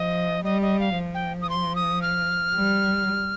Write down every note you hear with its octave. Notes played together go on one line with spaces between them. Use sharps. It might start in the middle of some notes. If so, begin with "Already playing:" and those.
Already playing: F3 D#5
G3 D#5
D#5
F5
F3
G5
D#6
C6
D#6
F6
G3